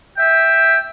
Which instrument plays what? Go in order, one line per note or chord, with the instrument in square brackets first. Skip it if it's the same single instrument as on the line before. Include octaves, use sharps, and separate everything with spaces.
[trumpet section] E5 G5